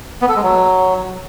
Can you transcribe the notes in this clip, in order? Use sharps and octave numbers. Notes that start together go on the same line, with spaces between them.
B3
A4
G#3
F#3